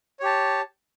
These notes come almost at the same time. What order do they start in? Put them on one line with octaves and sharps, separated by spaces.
C#5 G4 A5